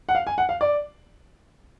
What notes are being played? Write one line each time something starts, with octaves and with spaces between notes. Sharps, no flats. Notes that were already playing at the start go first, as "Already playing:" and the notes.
F#5
F5
G#5
F#5
F5
D5